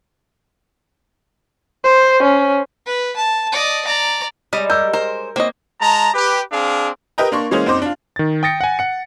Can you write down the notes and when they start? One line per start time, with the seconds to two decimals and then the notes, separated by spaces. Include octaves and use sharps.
1.84 C5
2.23 C#4
2.86 B4
3.16 A5
3.53 D5 D#5
3.85 D5 A#5
4.53 G3 G#3 D#4 C#5 D#5
4.70 A#4 E6 G6
4.93 A#4 C5
5.36 A#3 C4 E4 C#5 D#5
5.81 G#3 A5 A#5
6.14 G4 B4
6.51 C4 D4 G#4 F5
7.18 G4 A#4 B4 D#5 G5 A#5
7.32 A#3 D4 C6 C#6
7.51 E3 G#3 A#3 C#4 G#4 C5
7.66 F#2 C4 D#4 C5 D6
7.82 D4 F4
8.16 D#3 A6
8.43 G5 D#6 A6 A#6 C#7
8.61 F#5 G#5
8.79 F#5 C#7